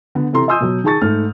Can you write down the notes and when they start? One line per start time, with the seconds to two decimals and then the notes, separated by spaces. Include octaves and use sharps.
0.15 D3 B3
0.33 C3 E3 A4 A#5 C6
0.48 D#5 G#5 C6 D#6 E6 G6
0.60 B2 F#3
0.84 D#3 G#4 A5 C#6 A6
1.01 G#2 A3 F6